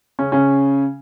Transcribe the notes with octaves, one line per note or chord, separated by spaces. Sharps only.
C#3 C#4
C#3 C#4